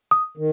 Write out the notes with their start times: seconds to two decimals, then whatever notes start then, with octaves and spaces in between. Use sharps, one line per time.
0.11 D#6
0.37 D#3